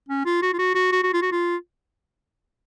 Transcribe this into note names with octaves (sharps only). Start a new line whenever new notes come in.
C#4
F4
F#4
F4
F#4
F#4
F#4
F#4
F4
F#4
F4